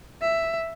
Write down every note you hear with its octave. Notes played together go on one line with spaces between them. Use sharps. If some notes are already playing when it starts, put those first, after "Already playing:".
E5